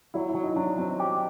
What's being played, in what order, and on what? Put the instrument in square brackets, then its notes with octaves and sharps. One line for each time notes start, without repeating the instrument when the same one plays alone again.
[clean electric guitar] F#3 [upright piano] E4
[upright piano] E4
[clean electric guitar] F#3
[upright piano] D#4
[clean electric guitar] F#3 [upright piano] D4
[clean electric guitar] F#3 [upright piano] C4
[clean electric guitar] G4